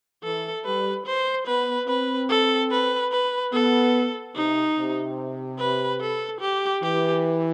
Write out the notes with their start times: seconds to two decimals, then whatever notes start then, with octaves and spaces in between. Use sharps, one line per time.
0.23 E3 A4
0.64 G3 B4
1.06 C5
1.47 B3 B4
1.88 C4 B4
2.29 A4
2.71 B4
3.12 B4
3.53 B3 A4
4.35 C3 D#4
4.77 C3
5.59 B4
6.00 A4
6.41 G4
6.82 E3 G4